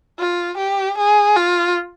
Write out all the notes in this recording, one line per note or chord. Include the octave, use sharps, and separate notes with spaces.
F4
G4
G#4
F4